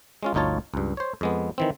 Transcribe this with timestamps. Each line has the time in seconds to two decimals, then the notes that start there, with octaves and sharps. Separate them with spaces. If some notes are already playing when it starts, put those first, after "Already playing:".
0.23 G#3 C#4 F4
0.34 G1 D2 D#4 F4 C#5 A5
0.74 C#2 G2
0.97 C5 C#5
1.21 F2 G#3 B3
1.58 D#3 E3 C4